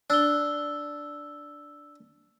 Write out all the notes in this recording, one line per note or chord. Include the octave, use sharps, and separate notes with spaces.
D4 E6 G7